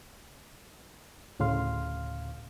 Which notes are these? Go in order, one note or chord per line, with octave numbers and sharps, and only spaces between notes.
D2 A2 C#3 F5 C6 F6